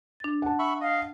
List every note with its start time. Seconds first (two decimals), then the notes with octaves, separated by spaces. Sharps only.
0.20 D4 A6
0.42 F#5 A5
0.59 E5 B5 C#6
0.81 D#5 F5